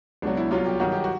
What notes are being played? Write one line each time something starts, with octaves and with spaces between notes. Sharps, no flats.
C#2 B2 F#3 D4
E4
C2 B2 F#3 F4
G4
G2 D#3 F#3 F#4
G4
F#4